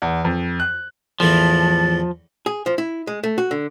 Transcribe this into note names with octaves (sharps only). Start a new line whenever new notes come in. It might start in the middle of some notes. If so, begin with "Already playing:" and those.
E2
F2
F#6
E2 A2 E3 F3 A5
G#4
F3
E4
G#3
A3
F#4
D3